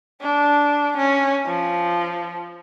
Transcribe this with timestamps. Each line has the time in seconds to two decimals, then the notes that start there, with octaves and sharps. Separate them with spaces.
0.22 D4
0.97 C#4
1.46 F3